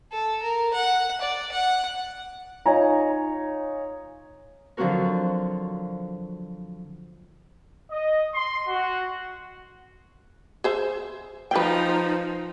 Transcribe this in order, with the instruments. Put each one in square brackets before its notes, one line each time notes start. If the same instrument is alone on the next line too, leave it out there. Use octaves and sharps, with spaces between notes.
[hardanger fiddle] A4
A#4
F#5
D5
F#5
[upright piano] D#4 F4 C#5 G#5 A#5
[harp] D3 F3 F#3 C4 F#4 A#4
[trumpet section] D#5
C6
F#4
[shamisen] G#4 C5 E5
[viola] F3 D#4 [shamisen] B4 G5